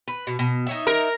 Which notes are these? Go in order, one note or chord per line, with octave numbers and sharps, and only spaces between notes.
B4
B2
B2
D#4 C#5 E5
A#4